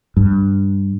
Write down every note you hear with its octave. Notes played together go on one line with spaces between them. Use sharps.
G2